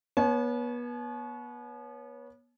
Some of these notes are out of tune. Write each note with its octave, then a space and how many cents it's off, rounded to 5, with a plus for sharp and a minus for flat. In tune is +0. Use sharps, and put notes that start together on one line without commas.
B3 -30 C#5 +0 A5 -45